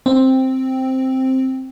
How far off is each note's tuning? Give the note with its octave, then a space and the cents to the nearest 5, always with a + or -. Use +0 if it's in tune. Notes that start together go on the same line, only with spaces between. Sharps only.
C4 +5